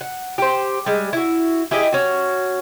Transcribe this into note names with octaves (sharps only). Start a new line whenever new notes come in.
F#5
G4 C5
G3 G#3
E4 F#4
E4 G4 G#4 D#5
C#4 F#4